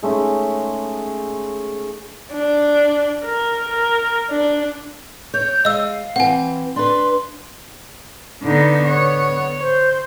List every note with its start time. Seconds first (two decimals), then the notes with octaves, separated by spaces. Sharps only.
0.03 G#3 A3 C#4 D#4
2.34 D4
3.24 A#4
3.69 A#4
4.31 D4
5.34 C#5 G6
5.65 G#3 D#5 F5 E6
6.16 E3 C4 F#5 G#5
6.76 D4 B4 C6
8.43 D3 B3 D#4
8.86 B3 C#5
9.61 C5